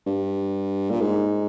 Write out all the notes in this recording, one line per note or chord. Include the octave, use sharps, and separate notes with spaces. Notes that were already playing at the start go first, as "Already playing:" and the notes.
G2
A#2
G#2